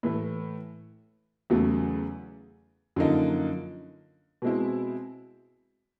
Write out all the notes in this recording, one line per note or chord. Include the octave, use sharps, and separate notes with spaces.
A2 E3 A3
E2 C#3 F#3 A3
F#2 D3 F3 A#3 D#4
B2 G#3 C4 E4